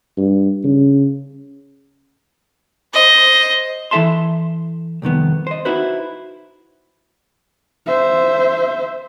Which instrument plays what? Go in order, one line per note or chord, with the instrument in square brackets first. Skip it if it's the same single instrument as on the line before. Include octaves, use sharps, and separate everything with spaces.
[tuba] G2
C#3
[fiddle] C5 D#5
[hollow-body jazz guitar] E3 E4 A4 E5 A5 C6
C2 F2 D#3 B3
C5 D#5
D#4 E4 F#4 B4 C5
[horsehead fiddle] C5 E5